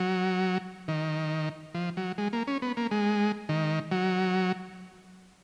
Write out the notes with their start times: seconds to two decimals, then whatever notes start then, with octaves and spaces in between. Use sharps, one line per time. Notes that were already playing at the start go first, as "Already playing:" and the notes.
Already playing: F#3
0.88 D#3
1.75 F3
1.97 F#3
2.18 G#3
2.33 A#3
2.48 C#4
2.62 B3
2.77 A#3
2.91 G#3
3.49 D#3
3.92 F#3